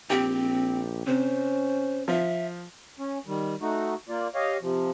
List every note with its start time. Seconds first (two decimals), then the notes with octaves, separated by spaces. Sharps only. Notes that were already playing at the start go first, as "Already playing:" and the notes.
0.10 A#1 C4 G4
1.07 C3 C#4 C5
2.08 F3 E5
2.99 C#4
3.26 D#3 G3
3.61 A3 D#4 F#4
4.09 A#3 F4 D5
4.35 G4 C#5 D#5 F5
4.62 C3 F3